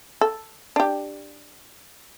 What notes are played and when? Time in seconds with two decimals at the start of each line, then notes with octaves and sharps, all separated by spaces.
0.21 A4
0.76 D4 G4